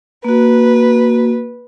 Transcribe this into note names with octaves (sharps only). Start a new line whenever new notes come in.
A#3 F#4 B4